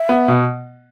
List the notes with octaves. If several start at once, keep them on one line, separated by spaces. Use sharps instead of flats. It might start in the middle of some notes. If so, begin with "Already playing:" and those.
Already playing: E5
B3
B2